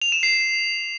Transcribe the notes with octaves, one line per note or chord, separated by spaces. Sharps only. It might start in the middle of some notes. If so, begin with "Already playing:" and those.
F7
E7
C7